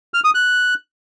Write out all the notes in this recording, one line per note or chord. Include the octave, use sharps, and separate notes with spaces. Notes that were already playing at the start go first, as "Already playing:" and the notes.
F6
D#6
F#6